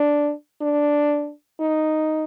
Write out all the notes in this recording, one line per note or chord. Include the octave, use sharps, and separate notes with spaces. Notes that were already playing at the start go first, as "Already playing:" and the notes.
Already playing: D4
D4
D#4